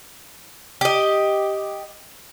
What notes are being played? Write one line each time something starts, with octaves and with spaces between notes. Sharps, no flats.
G4 D#5